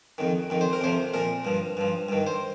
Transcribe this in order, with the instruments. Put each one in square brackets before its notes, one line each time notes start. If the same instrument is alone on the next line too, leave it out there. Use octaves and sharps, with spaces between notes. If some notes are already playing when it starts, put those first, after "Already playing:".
[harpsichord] F2 D#3
F2 D#3
C5
A#4
F2 C3 F3 C5
A#2 F3 A#4
G2 F3
G2 F3
G2 D#3
C5